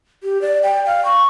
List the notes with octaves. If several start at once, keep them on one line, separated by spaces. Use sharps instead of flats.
G4
D5
G5
F5
C#6